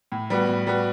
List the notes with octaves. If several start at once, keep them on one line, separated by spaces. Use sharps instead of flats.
A2
G3 B3 F#4
A2
G3 B3 F#4